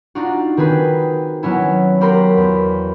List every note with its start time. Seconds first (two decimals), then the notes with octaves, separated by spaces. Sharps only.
0.15 D4 D#4 F4 F#4
0.57 D#3 C4 G#4 B4
1.43 F#3 B3 C#4 E4
2.01 F#4 G4 A#4 B5 C6
2.37 E2